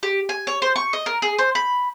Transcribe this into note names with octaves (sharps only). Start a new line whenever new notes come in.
G4
G#5
C#5
C5
C#6
D#5
A#4
G#4
C5
B5